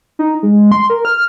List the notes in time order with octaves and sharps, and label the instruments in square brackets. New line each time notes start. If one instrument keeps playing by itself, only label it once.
[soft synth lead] D#4
G#3
C6
A#4
F6